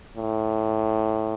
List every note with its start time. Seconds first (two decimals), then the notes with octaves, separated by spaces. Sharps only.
0.17 A2